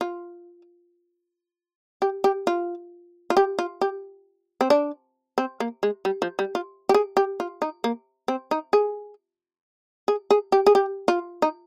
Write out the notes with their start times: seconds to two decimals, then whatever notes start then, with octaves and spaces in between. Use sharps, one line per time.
0.01 F4
2.02 G4
2.24 G4
2.47 F4
3.30 F4
3.37 G4
3.59 F4
3.81 G4
4.61 C4
4.70 D4
5.38 C4
5.60 A#3
5.83 G#3
6.05 G3
6.22 F3
6.39 G3
6.55 F4
6.89 G4
6.94 G#4
7.17 G4
7.40 F4
7.62 D#4
7.84 A#3
8.28 C4
8.51 D#4
8.73 G#4
10.08 G#4
10.30 G#4
10.52 G4
10.66 G#4
10.75 G4
11.08 F4
11.42 D#4